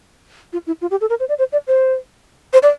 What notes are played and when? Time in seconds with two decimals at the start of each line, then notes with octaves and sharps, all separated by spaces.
0.53 F4
0.67 E4
0.81 F4
0.91 G4
1.01 A4
1.10 A#4
1.20 C5
1.29 D5
1.39 C5
1.52 D5
1.67 C5
2.53 C5
2.63 D5